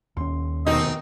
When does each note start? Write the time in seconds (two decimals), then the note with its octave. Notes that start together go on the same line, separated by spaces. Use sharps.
0.17 D#2 C#4 C6
0.67 F1 B1 D#3 C4 D#4 D#5